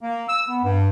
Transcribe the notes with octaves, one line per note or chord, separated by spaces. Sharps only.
A#3
E6
B3
G2